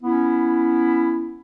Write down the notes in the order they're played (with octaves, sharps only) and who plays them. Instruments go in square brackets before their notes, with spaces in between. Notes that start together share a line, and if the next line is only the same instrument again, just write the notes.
[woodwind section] B3 C#4 E4